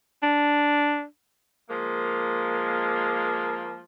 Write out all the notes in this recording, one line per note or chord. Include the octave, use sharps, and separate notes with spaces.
D4
F3 G#3 A#3